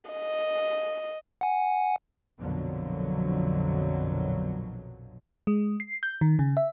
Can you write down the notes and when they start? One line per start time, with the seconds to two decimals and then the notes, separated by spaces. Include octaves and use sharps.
0.11 D#5
1.41 F#5 G#5
2.40 A#1 F2 B2 D3 F3 F#3
5.47 G#3
5.80 C7
6.03 G6
6.21 D#3
6.39 C#3
6.57 E5